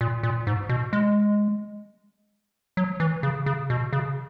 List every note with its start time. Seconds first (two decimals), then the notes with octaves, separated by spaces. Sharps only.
0.01 A#2
0.23 A#2
0.47 G#2
0.69 B2
0.93 G#3
2.77 F#3
3.00 E3
3.23 C#3
3.46 C#3
3.70 B2
3.93 C#3